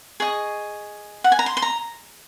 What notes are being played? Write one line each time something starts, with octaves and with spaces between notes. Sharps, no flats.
G#4 D#5 C#6
F#5
G#5
A#5
C6
C6
A#5